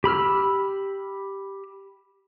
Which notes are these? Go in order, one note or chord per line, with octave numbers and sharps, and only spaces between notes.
G4 B5 E6 F6